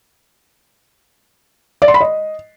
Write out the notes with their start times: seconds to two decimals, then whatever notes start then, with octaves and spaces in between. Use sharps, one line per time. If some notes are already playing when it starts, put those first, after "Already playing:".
1.82 D5
1.88 C6
1.94 B5
2.01 D#5